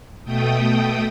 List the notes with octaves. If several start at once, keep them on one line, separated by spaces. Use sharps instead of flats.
B2 A3 G5 D#6